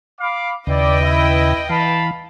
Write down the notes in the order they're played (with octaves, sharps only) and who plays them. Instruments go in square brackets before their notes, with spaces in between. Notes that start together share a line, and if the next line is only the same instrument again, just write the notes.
[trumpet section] F5 B5 D6
[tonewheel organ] D#2 C#3 [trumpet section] E4 D5 [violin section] B4 D#5 G5
[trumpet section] E4
[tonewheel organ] E3 [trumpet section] F5 A5 B5